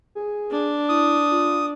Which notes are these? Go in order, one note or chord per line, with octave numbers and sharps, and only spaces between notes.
G#4
D4
E4 D#6
F4